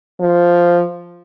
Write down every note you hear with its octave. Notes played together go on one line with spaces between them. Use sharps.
F3